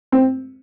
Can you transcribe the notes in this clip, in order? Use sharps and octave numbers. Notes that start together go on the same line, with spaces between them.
C4